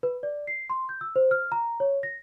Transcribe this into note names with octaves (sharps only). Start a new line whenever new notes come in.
B4
D5
C7
C6
G6
E6
C5
F6
A#5
C#5
A#6